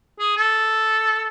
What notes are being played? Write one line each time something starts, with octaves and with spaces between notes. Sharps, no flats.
G#4
A4